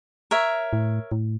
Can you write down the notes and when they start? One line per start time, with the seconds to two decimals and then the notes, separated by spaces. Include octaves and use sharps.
0.31 A#4 C#5 E5
0.73 A2
1.12 A2